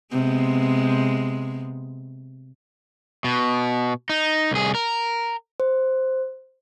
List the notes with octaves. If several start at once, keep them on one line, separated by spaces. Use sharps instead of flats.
C3 G#3 B3
B2
D#4
C2 G#4
A#4
C5